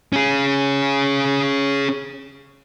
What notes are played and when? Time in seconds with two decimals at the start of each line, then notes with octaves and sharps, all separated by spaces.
0.13 C#4 G#4